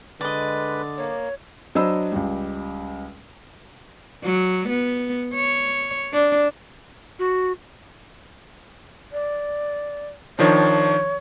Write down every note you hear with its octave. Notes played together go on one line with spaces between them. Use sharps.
D3 G#3 B4 D5 D#5
A#3 C#5
F#3 D4 C5 D#5 B5 E6
C#2 G3
F#3
B3
C#5
D4
F#4
D5
D#3 F3 D4 C#5